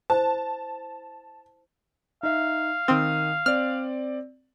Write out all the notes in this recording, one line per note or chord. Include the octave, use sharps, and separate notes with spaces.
E4 C5 A5
D#4 E5 F5
D#3 C4 D#6
C4 D5 F6